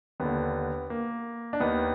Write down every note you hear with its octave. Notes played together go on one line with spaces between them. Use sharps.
D#2 D3 B3
A#3
D4
D#2 D#3 B3